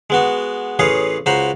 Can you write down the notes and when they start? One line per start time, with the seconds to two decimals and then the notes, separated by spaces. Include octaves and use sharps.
0.10 G#3 B3 F#4
0.79 A1 G#4 B4 C#5 F5 D#6
1.26 C#2 F#4 C5 A#5 B5